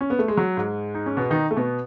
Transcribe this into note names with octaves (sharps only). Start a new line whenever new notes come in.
C#4
B3
A3
G#3
F#3
G#2 G#3
D#4
C#4
B2 B3
D#3 D#4
A3
B2 B3